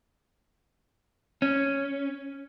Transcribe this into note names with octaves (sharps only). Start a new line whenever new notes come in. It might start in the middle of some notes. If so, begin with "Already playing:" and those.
C#4